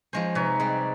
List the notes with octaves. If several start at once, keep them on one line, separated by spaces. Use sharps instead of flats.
F3 G#3 C#4 C5
C3 D#4 B4 C#5 A#5
G3 G#3 C4 D5